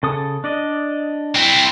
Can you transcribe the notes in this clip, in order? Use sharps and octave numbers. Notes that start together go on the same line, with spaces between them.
C#3 A4 D#6
D4 D5 D#5
C4 E4